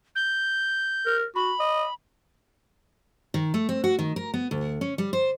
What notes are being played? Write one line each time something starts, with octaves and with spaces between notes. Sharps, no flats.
G6
A#4
F#4 B5
D#5
D#3
A3
C4
F#4
D#3
A#4
B3
D2
C#4
G3
C5